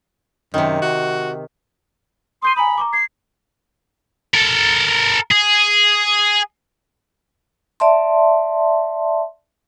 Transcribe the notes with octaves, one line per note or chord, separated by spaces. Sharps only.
F#2 C3 D#3
F#4
C6 D#6 G6 D#7
G#5 A#5 B5 D#6
A#5 C#6 D6
G#6 C7
A4 A#4
G#4
D5 E5 A5 C6